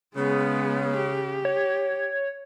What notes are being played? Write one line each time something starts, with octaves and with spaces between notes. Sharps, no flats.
C#3 G#3 B3
G4
C#5